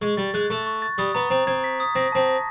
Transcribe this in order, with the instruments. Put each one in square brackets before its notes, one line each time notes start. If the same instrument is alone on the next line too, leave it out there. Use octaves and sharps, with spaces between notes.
[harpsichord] G#3 [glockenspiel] C#6
[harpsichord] G3 [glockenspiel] A6
[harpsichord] G#3 [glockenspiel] F#6
[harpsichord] A3 [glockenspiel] C#6
[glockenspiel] C#6
A6
[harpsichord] G3 [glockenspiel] D#6
[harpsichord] B3 [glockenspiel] A#5
[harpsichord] C4 [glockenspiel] A#5
[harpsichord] C4 [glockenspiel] G#6
[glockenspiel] B6
D#6
[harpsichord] C4 [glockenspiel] A#6
[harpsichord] C4 [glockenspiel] A5
[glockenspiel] A#6